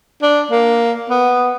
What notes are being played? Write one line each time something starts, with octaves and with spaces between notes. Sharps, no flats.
D4
A#3
B3